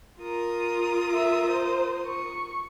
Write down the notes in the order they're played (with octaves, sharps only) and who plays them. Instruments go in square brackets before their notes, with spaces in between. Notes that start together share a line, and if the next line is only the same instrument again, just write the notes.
[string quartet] F4 A#4 D#6
[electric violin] E5
C5
C#6